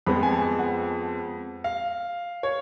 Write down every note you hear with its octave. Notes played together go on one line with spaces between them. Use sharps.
F2 F3 G#3 B3 B5
G#5
A5
F#5
F5
C#5